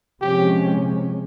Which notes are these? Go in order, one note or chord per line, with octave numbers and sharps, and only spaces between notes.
C3 F3 G#3 C#4 G4